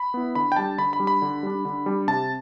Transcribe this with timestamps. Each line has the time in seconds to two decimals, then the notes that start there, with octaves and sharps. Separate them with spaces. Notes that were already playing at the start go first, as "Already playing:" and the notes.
Already playing: B5
0.14 B3 E4
0.35 D3 B5
0.52 G5
0.56 G3 D4 A5
0.78 D3 B5
0.93 B5
1.00 G3 D4
1.07 B5
1.22 D3
1.43 G3 D4
1.65 D3
1.86 G3 D4
2.08 C3 A5